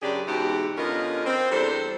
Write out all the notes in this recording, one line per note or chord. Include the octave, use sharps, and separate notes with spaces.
F#2 C#3 D4 G4 G#4 D5
G#2 B2 E3 F#4 G4
D3 B3 C#4 F4 A#4 D#5
C4
E2 G3 D4 A4 C5